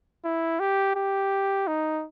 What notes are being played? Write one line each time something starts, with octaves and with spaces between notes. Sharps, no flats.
E4
G4
G4
D#4